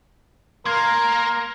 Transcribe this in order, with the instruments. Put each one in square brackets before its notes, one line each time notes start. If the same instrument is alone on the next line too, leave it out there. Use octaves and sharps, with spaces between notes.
[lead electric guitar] A#3 [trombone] A#4 [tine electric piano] C6 G#6